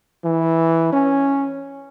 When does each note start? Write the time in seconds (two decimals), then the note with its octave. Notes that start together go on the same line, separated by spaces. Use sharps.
0.24 E3
0.93 C#4